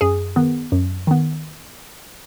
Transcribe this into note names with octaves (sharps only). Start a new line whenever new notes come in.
F#2 G#4
D#3 B3
F#2
D#3 B3